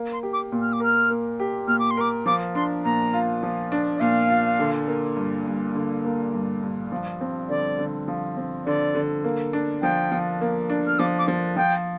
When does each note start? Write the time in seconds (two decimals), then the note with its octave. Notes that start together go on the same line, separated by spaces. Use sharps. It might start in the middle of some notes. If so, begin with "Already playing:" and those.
Already playing: A#3
0.13 C6
0.23 G4
0.33 D6
0.52 A#2
0.62 F6
0.73 D6
0.80 A#4 F6
1.10 A#3
1.40 G4
1.67 A#2 F6
1.79 D6
1.91 C6
1.97 A#4 D6
2.26 F3 D6
2.55 D4 C6
2.84 A#2 A#5
3.13 F4
3.43 F3
3.72 D4
3.96 D5
4.00 A#2 F5
4.30 F4
4.60 D3
4.87 A#3
5.17 G2
5.47 G2
5.75 D3
6.04 A#3
6.34 G2
6.62 G2
6.92 F3
7.21 C4
7.49 D3 D5
7.79 D3
8.08 F3
8.37 C4
8.65 D3 D5
8.95 D3
9.24 A#3
9.53 D4
9.82 F3 G5
10.12 F3
10.41 A#3
10.70 D4
10.87 F6
10.99 F3 D6
11.19 D6
11.28 F3
11.56 F3 G5